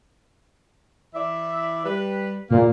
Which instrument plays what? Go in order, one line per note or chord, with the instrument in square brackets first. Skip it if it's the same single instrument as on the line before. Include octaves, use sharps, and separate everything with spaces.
[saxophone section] E3 D5 E5
G3 B4
[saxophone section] E2 A#3 [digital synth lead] A#2